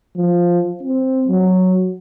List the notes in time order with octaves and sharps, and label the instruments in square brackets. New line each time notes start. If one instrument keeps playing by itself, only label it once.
[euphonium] F3
C4
F#3